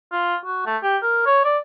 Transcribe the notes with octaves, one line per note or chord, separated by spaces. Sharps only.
F4
F#4
A3
G4
A#4
C#5
D5